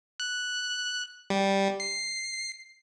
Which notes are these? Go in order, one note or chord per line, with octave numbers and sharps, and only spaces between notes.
F#6
G3
C7